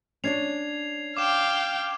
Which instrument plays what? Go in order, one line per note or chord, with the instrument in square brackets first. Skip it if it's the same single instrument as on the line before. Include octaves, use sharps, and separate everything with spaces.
[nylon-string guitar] C#4 D4 C#5 [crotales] G#6 C7 F7
[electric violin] F5 G5 [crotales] D6 E7